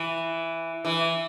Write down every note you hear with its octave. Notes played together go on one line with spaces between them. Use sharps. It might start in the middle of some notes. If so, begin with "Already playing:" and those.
Already playing: E3
E3